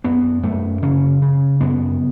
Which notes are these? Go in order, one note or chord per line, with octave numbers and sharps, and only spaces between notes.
F#2 B3
F#2 A3
C#3 C#4
C#3
F#2 B3